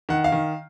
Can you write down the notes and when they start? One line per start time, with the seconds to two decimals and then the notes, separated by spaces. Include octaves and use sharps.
0.09 D#3 F#5
0.24 F5
0.32 D#3